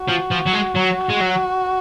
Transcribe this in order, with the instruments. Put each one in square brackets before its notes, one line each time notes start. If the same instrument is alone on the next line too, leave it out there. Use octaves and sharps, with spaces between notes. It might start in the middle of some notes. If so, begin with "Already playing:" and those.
Already playing: [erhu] F#4
[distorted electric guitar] F3
F3
F#3
G#3
F#3
G#3
F#3